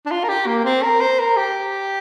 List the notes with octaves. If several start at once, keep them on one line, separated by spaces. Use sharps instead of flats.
D4
F4
A#4
G4
A#3
C4
A#4
C5
A#4
G4